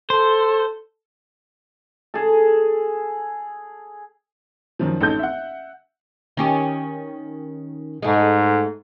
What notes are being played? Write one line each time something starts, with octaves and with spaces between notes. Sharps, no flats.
A4 C5
G#4 A4
F#2 D#3 F3
A1 D#4 A4 A5 G6
E5 F#5
D#3 C#4 G4
G#2 G#3 A3